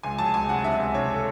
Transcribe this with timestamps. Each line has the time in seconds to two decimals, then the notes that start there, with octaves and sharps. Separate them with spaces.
0.03 C#2 G#5
0.18 F#3 A5
0.34 C#2 G#5
0.49 C3 F#5
0.64 C3 E5
0.80 C#2
0.94 C3 C#5
1.14 A4